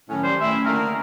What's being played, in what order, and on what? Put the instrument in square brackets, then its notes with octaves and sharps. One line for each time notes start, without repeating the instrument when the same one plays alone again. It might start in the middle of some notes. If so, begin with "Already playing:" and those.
[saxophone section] A2 [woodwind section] D#3 F#3 C#4
[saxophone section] G3 [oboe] C5
[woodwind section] A3 C#4 [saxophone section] E4 [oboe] E5
[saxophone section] D3 D#3 A#3 [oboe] A#4